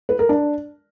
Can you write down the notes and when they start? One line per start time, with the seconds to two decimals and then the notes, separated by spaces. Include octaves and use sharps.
0.09 B4
0.19 A#4
0.29 D4